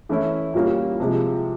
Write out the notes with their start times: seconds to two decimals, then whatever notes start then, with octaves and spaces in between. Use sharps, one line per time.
0.09 E3 A3 C#4 E4
0.54 A#2 G3 A#3 C#4
1.00 C3 F3 G#3